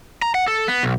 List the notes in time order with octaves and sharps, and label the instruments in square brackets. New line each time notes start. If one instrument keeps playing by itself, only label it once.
[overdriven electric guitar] A#5
F#5
A4
B3
B1